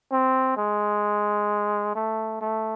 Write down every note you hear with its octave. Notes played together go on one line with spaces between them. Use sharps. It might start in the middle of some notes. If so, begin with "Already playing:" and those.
C4
G#3
A3
A3